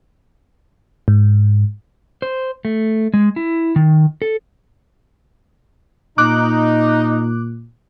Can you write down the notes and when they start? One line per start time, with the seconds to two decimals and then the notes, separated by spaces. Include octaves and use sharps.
1.08 G#2
2.22 C5
2.65 A3
3.14 G#3
3.36 E4
3.76 D#3
4.22 A4
6.18 A#2 D#4 D6 F#6